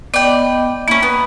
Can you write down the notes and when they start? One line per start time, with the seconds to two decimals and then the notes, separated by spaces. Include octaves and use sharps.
0.14 B3 D5 D#5 G5
0.88 A#3 C#4 E4
1.03 B3